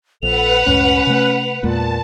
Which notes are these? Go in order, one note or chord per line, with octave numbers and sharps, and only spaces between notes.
A#1 F2 A4 B4 F#5 F7
C#2 F#2 A2 C#4
C3 A3
E2 A#2 G#3 A#3 A5